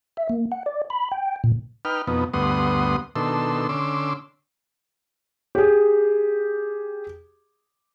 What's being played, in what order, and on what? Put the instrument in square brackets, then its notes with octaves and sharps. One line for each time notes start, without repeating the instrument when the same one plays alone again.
[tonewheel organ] E5
A#3
F#5
D5
B5
G5
A#2
[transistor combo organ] D#4 B4 G5 F6
F2 B2 B3 D#4
D2 G2 B3 F#5 C6 D#6
B2 D#3 D4 A4 C6 E6
D3 C#4 C6 D6 E6
[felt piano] G4 G#4